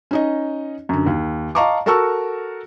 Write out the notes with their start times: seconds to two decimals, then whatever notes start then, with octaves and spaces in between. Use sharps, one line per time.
0.11 C#4 D#4 D#5
0.89 F#2 D3
1.06 D#2
1.55 D#5 F5 A5 A#5 C#6 D6
1.86 F#4 A4 A#4 A5 C#6 E6